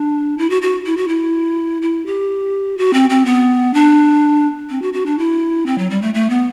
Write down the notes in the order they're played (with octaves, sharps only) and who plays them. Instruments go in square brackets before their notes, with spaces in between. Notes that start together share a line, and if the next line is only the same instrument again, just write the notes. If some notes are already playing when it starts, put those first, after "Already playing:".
Already playing: [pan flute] D4
E4
F#4
F#4
E4
F#4
E4
E4
G4
F#4
C4
C4
B3
D4
C4
F#4
F#4
D4
E4
C4
F#3
G3
A3
A3
B3